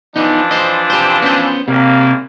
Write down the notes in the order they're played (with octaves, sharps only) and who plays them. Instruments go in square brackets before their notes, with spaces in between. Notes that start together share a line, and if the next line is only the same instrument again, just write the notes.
[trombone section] E3 F3 D4 [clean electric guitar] B3 D#4
[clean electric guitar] C5 D#5
G4 C5
B3 C#4 C5
[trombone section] G#1 A#3 [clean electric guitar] C3